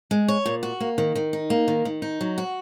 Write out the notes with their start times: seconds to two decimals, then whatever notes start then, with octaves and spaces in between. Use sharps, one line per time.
0.11 G#3
0.28 C#5
0.46 A#2
0.63 F#4
0.80 A#3
0.98 D#3
1.15 D#3
1.33 D#4
1.50 A#3
1.68 D#3
1.85 D#3
2.02 D#4
2.21 F#3
2.38 F#4